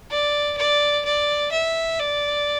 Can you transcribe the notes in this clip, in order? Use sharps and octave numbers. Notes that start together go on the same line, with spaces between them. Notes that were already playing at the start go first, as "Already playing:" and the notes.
D5
D5
D5
E5
D5